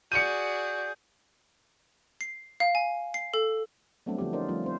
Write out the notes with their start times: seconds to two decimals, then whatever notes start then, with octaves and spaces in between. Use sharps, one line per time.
0.12 F#4 G#4 D5 G6 C#7 D#7
2.21 C7
2.60 F5
2.75 G#5
3.14 C7
3.34 A4
4.06 F#3 G3 A3 B3 C4 D4
4.18 D3 F3 B3 G4
4.33 C#4 D#4 A#4 C5 D5
4.49 F3 G3 A3 C#4 F4
4.64 C4 C5